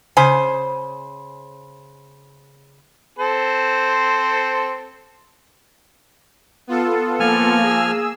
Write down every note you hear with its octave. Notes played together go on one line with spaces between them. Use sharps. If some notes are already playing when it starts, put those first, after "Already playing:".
C#3 C5 G#5
C4 A4 C5
B3 F4 A4
F3 A#3 G#5 F6
G#4 E6